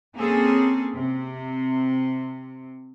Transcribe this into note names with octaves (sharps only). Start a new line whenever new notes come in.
A#3 C4 C#4 G#4 A4
C3